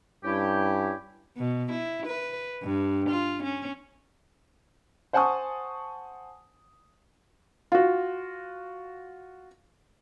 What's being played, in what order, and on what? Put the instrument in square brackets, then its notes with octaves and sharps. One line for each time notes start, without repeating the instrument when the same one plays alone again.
[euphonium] G2 [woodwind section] C#4 E4 G4
[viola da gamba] B2
E4
B4
G2
F4
C#4
[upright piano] C5 F#5 G#5 A5 C#6 D#6
[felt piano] F4 F#4